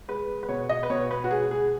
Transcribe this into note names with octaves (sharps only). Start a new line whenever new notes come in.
G#3 B4
B4
B2 C#5
D#5
B4
B2 C#5
B4
F#4
G#3 G#4
G#4